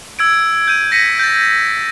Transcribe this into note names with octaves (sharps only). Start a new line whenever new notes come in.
E6 G#6 D7
G6 D#7
G#6 A#6 B6 C#7 D#7
G6 A6